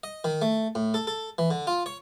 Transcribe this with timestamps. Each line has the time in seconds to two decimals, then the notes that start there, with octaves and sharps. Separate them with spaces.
0.04 D#5
0.24 D#3
0.42 A3
0.75 A2
0.94 A4
1.07 A4
1.38 E3
1.51 D3
1.67 F4
1.86 C#5